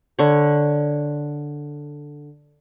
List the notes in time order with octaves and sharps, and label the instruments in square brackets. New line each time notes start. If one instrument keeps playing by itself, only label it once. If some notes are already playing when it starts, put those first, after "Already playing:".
[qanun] D3 C#5